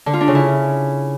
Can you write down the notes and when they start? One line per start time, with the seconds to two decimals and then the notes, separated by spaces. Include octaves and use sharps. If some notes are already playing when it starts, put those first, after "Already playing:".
0.06 D3
0.13 F4
0.21 D4
0.28 C#3
0.35 E4